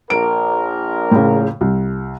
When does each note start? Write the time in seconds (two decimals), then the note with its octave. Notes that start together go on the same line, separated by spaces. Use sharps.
0.10 A#1 A#4 D7
1.11 A2 C#3
1.61 C2